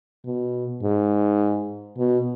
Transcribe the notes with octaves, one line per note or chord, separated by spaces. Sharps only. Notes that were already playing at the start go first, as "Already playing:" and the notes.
B2
G#2
B2